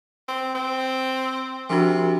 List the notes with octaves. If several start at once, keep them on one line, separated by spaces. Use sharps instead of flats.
C4
C4
C3 F3 D4 F#4